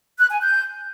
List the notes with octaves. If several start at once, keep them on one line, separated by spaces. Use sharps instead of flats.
F#6
G#5
G6